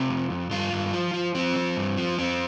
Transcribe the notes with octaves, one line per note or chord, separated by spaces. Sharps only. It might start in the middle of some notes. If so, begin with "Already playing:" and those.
Already playing: C3 F4
F2
F2
G2 F4
G2
F3
F3
F3 C4
F3
G2
F3
F2 C4